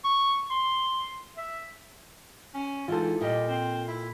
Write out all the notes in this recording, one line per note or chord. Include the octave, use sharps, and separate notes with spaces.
C#6
C6
E5
C#4
G#2 E3 F4 A4 C5
A#2 G3 D#5
C4
E4